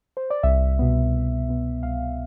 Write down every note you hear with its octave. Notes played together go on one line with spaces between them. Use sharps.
C5
D5
C2 E5
B2 B3
C2
B2 B3
C2 F5